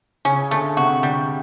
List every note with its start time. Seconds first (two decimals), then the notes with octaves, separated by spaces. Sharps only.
0.25 C#3 C#4
0.51 D3 A3
0.77 C3 F#4
1.03 D3 G3